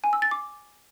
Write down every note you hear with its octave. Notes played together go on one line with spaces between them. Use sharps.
G#5
E6
A6
D6